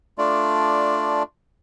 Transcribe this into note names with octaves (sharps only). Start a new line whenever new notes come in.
A3 D4 F4 D5